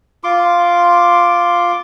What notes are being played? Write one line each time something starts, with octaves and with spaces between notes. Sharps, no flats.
F4 C6 D6